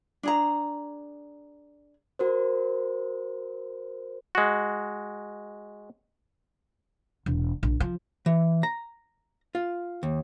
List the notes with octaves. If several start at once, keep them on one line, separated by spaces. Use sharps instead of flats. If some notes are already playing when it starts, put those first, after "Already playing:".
D4 G#4 A#5
F#4 A#4 C5
G#3 F#4
E1
A#1
F3
E3
A#5
F4
D#2